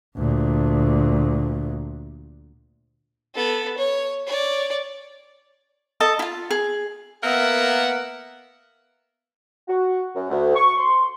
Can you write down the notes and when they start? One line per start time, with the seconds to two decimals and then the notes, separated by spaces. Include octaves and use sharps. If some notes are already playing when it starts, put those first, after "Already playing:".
0.17 D2 A#2
3.35 B3 A4
3.77 C#5
4.27 C#5 D5
6.00 A4 D#5 A5
6.19 E4 F4
6.51 G#4
7.24 A#3 B3 A#4 E5 F#5
9.68 F#4
10.15 F#2
10.30 D2
10.55 C#6
10.78 C6